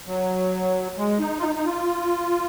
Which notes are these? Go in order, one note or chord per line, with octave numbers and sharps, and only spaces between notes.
F#3
G#3
D#4
F4
D#4
D#4
F4